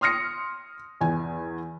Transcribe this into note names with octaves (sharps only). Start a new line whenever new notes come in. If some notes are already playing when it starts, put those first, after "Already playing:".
C6 D#6 F6 A#6 C#7
E2 G#5